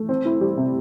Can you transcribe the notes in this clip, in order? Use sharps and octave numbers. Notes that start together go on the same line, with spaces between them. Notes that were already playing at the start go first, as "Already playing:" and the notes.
Already playing: A3
C4
E4
G3
C3